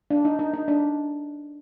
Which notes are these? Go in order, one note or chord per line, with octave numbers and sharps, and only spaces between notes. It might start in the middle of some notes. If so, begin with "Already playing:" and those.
D4
D#4
D#4
D#4
D4